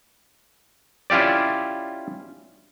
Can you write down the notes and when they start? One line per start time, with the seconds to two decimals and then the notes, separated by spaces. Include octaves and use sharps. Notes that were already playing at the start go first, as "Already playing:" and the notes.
1.10 C#4 E4 F4 G4 D5